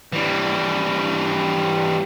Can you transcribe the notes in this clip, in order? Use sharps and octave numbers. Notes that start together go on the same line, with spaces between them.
E3 G3